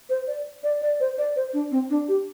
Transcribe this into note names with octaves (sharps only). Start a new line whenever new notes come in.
C5
D5
D5
D5
C5
D5
C5
D4
C4
D4
G4